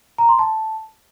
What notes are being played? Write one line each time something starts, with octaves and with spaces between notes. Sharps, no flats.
A#5
C6
A5